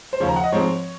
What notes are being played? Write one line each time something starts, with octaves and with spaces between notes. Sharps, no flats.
C5
D#2 C#3 F3 C#5
A#5
F#5
D#5
G#2 F3 G#3 C4 C#5